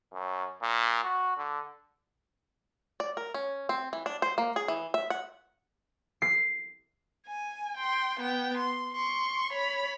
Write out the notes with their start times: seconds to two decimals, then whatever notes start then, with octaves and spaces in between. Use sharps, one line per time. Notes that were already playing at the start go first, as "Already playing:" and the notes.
0.13 F#2
0.62 A#2
1.04 F#4
1.37 D3
3.00 D5
3.17 A#4
3.34 C#4
3.69 C4
3.93 E3
4.06 D4
4.22 C5
4.38 A#3
4.56 G#4
4.68 E3
4.94 E5
5.10 F#5
6.22 C7
7.27 G#5
7.77 G5 C6
8.20 B3 G5
8.57 C6
8.94 C6 C#6
9.53 C#5 B5